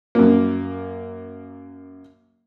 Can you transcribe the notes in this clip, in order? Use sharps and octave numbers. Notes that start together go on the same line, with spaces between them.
F#2 A#3